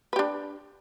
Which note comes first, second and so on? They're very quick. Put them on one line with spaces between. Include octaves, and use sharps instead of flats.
B4 G4 D4